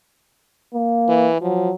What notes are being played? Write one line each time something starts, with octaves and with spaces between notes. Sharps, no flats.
A#3
E3
F3 F#3